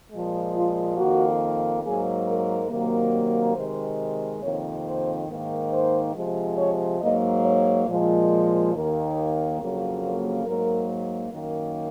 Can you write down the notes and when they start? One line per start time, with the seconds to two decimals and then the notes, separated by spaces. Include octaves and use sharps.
0.12 A#2 F3 G#3
0.55 F4
0.98 F2 D#3 A#3 F#4
1.84 G#2 F#3 A#3 G#4
2.27 A#4
2.70 C3 D#3 F#3 A#3
3.56 C3 D#3 G#3 C5
4.42 F2 C3 D#3 A#3 C#5
4.85 C5
5.28 G#2 D#3 A#3
5.72 C5
6.15 C3 F3 G#3
6.58 C#5
7.01 G#2 F#3 A#3 D#5
7.44 C#5
7.88 A#2 F3 G#3
8.73 D#2 D#3 A#3
9.59 F2 C#3 F#3 A#3
10.02 C5
10.45 G#2 F#3 A#3 A#4
11.32 F#2 D#3 A#3